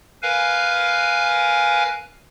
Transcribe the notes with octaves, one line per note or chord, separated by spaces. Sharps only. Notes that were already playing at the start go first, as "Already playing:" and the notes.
A#4 B4 F5 G#5